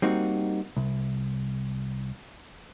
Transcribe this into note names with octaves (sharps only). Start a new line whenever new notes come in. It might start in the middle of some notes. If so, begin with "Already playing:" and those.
G3 A#3 C4 D#4 F#4
C2